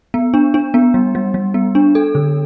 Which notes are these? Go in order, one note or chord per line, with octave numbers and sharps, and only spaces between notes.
B3
D4
D4
B3
G3
G3
G3
B3
D4
A4
D3